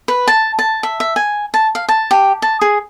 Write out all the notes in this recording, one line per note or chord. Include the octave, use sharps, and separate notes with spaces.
B4
A5
A5
E5
E5
G#5
A5
F5
A5
G4
A5
G#4